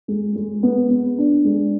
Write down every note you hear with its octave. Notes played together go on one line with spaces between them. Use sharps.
G#3
G#3
B3
B3
D4
G#3